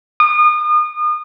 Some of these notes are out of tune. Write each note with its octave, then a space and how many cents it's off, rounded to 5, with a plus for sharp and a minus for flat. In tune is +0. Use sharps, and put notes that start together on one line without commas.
D#6 -35